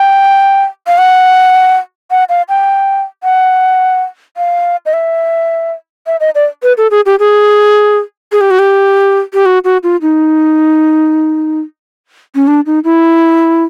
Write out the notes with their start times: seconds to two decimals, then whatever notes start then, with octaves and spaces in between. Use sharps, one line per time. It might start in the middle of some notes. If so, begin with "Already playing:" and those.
Already playing: G5
0.87 F5
0.98 F#5
2.11 F#5
2.29 F5
2.49 G5
3.23 F#5
4.37 F5
4.86 D#5
4.93 E5
6.07 E5
6.20 D#5
6.35 D5
6.63 B4
6.77 A4
6.91 G#4
7.06 G4
7.19 G#4
8.32 G#4
8.41 G4
8.51 F#4
8.59 G4
9.34 G4
9.46 F#4
9.64 F#4
9.83 F4
10.02 D#4
12.35 C#4
12.47 D4
12.66 D#4
12.84 E4